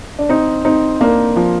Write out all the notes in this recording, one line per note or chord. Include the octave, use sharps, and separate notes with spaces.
D4
C4 D#4
C4 D#4
A#3 D4
F3